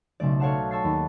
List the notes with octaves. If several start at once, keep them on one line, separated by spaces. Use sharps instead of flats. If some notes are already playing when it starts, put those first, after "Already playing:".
B1 C#3 A3 D5
A4 C#5 D5 F5 F#5 A5
A5 C#6 E6 A6 C7
D#2